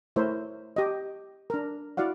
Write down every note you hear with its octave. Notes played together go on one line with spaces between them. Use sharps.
A3 E4 A#4 C5 C#5 E5
G4 D#5
D4 A#4
E4 F#4 D5 F5 F#5